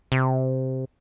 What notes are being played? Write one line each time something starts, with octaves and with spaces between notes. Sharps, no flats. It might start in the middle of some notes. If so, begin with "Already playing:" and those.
C3